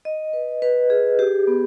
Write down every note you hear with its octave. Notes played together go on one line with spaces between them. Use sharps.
D#5
B4
B4
G#4
G4
B3